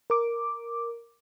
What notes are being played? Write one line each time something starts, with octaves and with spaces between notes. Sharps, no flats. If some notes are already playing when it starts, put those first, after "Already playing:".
A#4 D6